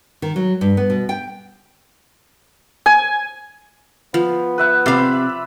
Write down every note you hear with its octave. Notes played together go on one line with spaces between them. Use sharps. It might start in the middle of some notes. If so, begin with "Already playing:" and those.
D#3
F#3
G2
B3
B2
G5
G#5
F3 B3
B4 E5 F#5
C3 C5 D5 E5 F5 B5